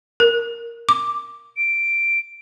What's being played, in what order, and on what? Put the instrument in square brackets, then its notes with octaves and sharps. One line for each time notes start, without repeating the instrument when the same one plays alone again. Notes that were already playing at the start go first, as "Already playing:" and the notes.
[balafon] A#4
D6
[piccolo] D7